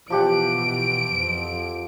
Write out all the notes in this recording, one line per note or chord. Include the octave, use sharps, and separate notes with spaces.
B2 E3 F3 G4 F#5 D7
F2